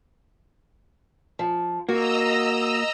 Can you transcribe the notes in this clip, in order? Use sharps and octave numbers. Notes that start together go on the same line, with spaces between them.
F3
A#3 F#4 D#5 A#5 E6